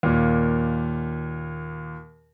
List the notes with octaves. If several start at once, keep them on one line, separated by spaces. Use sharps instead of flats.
D#2 A#2